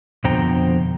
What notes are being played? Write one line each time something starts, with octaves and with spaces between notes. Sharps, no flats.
F2 B2 D3 C5 G5 A#5